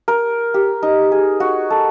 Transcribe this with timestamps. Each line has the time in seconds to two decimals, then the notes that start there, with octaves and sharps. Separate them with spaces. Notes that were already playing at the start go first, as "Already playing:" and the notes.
0.08 A#4
0.54 G4
0.83 D#4
1.12 G#4
1.40 F#4
1.70 A4